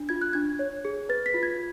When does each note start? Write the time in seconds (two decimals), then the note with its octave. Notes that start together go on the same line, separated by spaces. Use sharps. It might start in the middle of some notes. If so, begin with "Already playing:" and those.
Already playing: D4
0.09 F4 G#6
0.21 F#6
0.33 D4 G#6
0.59 C#5
0.85 G#4
1.09 B4 A6
1.26 B6
1.34 F4
1.43 G#6